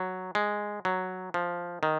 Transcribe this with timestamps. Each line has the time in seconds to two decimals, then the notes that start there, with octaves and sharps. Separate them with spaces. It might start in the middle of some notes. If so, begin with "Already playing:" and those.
Already playing: F#3
0.35 G#3
0.85 F#3
1.34 F3
1.83 D#3